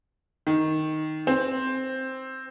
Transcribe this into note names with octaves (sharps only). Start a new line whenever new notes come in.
D#3
C4